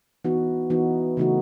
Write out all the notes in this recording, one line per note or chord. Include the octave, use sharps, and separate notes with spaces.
E3 B3 D#4 F#4
E3 B3 D#4 F#4
C#3 E3 A3 D#4 F#4